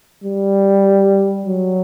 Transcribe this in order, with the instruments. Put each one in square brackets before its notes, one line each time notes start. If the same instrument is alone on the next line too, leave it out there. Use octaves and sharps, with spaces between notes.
[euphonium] G3
F#3